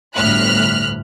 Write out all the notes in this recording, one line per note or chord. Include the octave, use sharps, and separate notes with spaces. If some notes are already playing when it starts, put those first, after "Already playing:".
G1 D2 A2 F6 F#6 B6